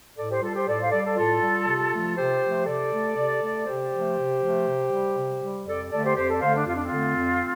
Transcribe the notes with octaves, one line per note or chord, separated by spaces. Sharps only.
A2 A4 D5
G4 C5
G3 F4 A4
G4 C5
A2 A4 D5
C5 F5
G3 A4 D5
A4 D5
A2 F4 A4
G3
C3
F3 A3
C3 G4 C5
F3 A3
C3 A4 D5
A3
C3
A3
C3 G4 C5
F3
A3
C3
F3 A3
C3
G3
C3
G3
F2 A4 D5
D3 A3 A4 D5
G4 C5
F2 G4 C5
A4 D5
D3 A3 C5 F5
D4
F2 F4
D4
C4 F4
D3 A3
F2